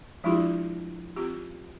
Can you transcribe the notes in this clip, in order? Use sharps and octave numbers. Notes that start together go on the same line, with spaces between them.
F3 G#3 D4 E4 F4 G4
C4 F4 G4